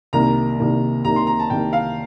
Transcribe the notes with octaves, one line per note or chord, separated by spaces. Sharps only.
C2 C3 D#3 A#3 A#5
C2 C3 D#3 A#3
C2 C3 D#3 A#3 A#5
C6
A#5
A5
C2 C3 D#3 A#3 G5
F5